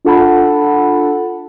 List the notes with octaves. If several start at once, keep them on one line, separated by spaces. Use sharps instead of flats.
D4 F4 A4 F#5 A5 B5